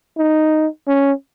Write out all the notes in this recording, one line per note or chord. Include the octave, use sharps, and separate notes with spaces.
D#4
C#4